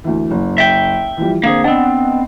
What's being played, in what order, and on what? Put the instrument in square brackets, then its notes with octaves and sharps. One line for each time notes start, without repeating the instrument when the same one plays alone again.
[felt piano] D2 E3
F#1
[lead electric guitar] E5 G5
[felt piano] E3 F3 G3
[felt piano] D3 C4 [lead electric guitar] A#3 G#4
[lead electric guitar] B3 C4 [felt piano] D4 D#5 F#5